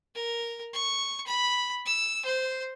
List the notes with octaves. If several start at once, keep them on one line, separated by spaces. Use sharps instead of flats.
A#4
C#6
B5
E6
C5